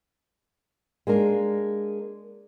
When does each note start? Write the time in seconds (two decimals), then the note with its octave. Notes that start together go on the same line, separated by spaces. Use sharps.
1.07 G#3 A#3 D4 A#4